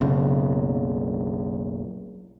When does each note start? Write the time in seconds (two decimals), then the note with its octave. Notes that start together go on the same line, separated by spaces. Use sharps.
0.01 F#1 B1 C#3